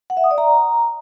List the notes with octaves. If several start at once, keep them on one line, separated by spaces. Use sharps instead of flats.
F#5
E5
D#6
D5
A#5